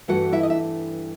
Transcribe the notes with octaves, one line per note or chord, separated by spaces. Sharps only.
G2 E3 A3 F#4 F#5
E4 E5
D#5
E5